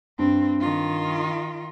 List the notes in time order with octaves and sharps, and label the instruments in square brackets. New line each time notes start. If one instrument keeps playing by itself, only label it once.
[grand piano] G2 [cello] C4
[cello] D#3 F4